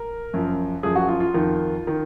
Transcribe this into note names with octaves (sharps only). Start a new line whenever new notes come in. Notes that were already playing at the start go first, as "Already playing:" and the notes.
Already playing: A#4
F#2 F3
F#2 F3 G#4
F#4
F4
F4
F2 D#3
D#3